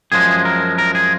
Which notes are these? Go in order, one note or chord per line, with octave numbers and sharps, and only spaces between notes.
F#2 F3 G#3 G#4
A#4
A#4
G#4